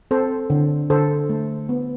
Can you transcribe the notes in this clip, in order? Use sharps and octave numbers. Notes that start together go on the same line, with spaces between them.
C4 A4 C5
D3
D3 A4 C5
A3
B3